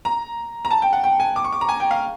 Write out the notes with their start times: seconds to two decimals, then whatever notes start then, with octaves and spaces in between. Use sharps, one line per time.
0.05 A#5
0.65 A#5
0.71 A5
0.82 G5
0.93 F#5
1.04 G5
1.20 G#5
1.36 D6
1.44 C#6
1.52 D6
1.61 A#5
1.69 G#5
1.80 G5
1.91 F5